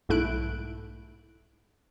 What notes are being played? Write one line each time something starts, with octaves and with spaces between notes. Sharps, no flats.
B1 G#2 A3 E4 F#6 D7